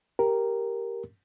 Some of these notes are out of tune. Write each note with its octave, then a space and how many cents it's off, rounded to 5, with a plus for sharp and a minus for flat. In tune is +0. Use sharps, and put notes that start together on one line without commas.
G4 +0 A#4 +0